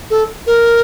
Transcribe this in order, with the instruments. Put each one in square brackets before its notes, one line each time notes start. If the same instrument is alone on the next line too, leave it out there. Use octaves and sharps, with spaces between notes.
[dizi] A4
A#4